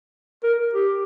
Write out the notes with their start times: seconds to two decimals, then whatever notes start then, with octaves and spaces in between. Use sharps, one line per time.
0.43 A#4
0.73 G4